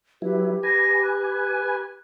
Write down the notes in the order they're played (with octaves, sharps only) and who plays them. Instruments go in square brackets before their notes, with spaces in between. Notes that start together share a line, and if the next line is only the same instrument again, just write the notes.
[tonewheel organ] F#3 E4 [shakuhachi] G4 [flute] B4
[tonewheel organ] B4 G#5 [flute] A#6
[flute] F#6